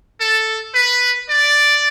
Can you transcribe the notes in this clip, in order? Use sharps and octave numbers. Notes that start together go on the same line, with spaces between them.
A4
B4
D5